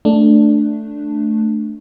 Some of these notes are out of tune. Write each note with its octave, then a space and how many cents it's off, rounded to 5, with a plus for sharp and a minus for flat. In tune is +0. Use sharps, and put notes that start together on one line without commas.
A3 +0 D4 +0